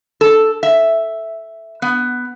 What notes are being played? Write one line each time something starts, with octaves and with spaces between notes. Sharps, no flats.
A4
E5
B3